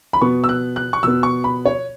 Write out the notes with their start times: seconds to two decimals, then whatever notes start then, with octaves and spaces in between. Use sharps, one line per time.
0.13 B5
0.21 B2 B3 C#6
0.44 E6
0.49 F#6
0.76 F#6
0.93 C#6
1.03 B2 B3 E6
1.23 C#6
1.44 B5
1.65 C#5